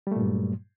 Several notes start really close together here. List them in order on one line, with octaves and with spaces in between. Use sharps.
G3 A3 A#2 G2 F#3